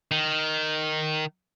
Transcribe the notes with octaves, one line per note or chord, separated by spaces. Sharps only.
D#3